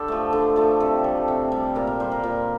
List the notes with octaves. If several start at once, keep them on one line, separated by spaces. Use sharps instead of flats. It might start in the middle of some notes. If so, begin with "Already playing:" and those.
Already playing: D3 G4 A4
F3 A3
D3
F3 A3
C3 A4
G3
C3
G3
A#2 A#4
A#4
G3 C5
A#4
A#2